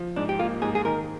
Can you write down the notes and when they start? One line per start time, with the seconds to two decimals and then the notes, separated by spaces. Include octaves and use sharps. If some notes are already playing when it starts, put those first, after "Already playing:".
Already playing: F3
0.16 G#2 D4
0.29 G4
0.39 A#3 F4
0.62 G#2 G#4
0.75 G#4
0.85 D#3 A#4